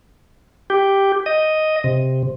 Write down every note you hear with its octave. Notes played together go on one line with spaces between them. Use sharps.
G4
D#5
C3